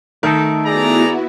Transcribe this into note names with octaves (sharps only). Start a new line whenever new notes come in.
D#3 A3 D#4 A4
B3 E4 F#4 G#4 D5 A#5